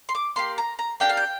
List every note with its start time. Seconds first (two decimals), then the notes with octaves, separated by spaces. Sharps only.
0.09 C6
0.15 D6
0.36 A#3 G4 C6
0.58 A#5
0.79 A#5
1.00 A#3 D4 G4 G5
1.09 F5
1.17 G5